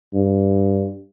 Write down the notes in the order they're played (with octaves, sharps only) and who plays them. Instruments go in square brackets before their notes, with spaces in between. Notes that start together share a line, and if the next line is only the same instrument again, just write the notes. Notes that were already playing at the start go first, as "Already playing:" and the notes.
[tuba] G2